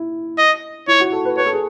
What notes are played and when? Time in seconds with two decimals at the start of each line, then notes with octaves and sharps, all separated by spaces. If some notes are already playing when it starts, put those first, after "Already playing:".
Already playing: E4
0.38 D#5
0.87 E4 C#5
1.00 F#4
1.12 A4
1.25 B4
1.37 B4 C#5
1.46 A4
1.53 G#4